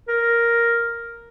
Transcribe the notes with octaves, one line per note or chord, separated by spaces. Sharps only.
A#4